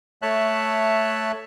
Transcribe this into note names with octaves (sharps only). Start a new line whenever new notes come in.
A3 C#5 E5 A5 F#6